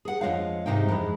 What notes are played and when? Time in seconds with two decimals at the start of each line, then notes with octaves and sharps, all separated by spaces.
0.05 G#4 F#5
0.21 F2 F3 G#3 F4 C#5 F5
0.66 G#2 C3 D#4 F5 G5
0.88 F2 E3 G3 G#3